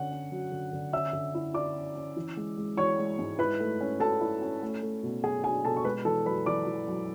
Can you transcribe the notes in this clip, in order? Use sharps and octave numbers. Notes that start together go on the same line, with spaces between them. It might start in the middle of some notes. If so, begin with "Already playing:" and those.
Already playing: D3 C#4 F#5
C#4
F#3
D3
D3
C#4 E5 E6
D3
E4
E4 D5 D6
C#4
C#4
E3
G#3
G#3
E3 C#5 C#6
G#3
G#2
E4 B4 B5
A3
C#4
C#4 A4 A5
E4
C#4
A3
A3
B2
F#3 G#4 G#5
D4 G#4 G#5
B2 A4 A5
C#6
G#3 B4 B5
E3 A4 A5
F#2 B4 B5
E3 D5 D6
E3
F#2